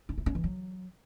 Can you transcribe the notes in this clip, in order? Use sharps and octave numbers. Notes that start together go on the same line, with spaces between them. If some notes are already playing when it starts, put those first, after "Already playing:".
C#4
E4
C#4
E3
F#3